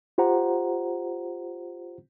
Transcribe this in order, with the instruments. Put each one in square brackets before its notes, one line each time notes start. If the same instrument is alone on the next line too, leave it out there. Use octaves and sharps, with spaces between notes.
[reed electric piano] F4 G4 C5 F#5 A#5